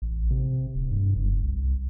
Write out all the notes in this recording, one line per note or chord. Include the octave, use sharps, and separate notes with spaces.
A1
C3
D#1
G2
F#1
C2